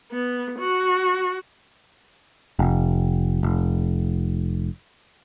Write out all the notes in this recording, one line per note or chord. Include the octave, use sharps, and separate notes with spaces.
B3
F#4
F1
F1